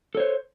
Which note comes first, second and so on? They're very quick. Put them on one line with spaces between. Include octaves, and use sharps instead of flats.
A4 C#5 C5